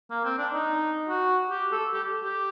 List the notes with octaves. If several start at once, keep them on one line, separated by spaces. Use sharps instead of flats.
A#3
C4
D4
D#4
F#4
G4
A4
G4
G4